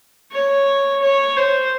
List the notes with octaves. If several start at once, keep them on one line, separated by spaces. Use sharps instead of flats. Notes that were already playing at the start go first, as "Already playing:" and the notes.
C#5
C#5
C5